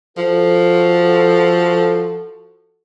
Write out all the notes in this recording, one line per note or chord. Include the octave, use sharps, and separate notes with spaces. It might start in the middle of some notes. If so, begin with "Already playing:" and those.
F3 F#4 A4